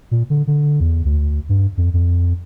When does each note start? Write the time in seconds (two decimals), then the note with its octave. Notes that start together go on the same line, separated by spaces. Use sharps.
0.11 A#2
0.30 D3
0.47 D3
0.80 E2
1.05 D2
1.49 G2
1.77 F2
1.94 F2